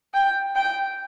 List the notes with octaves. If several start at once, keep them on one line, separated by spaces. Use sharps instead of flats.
G5
G5